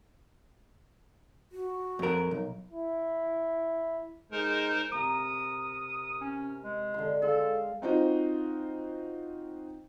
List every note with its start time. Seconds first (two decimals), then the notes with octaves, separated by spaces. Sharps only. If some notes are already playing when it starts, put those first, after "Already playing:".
1.52 F#4
1.99 F2 A#4
2.31 B1
2.72 E4
4.32 G#3 D#4 A#4 C5
4.92 C3 A#4 D#6
6.21 C#4
6.64 G#3
6.94 D3 C6
7.22 G#3 A4 F5 C6
7.82 C4 D#4 F4 F#4 C5 D#5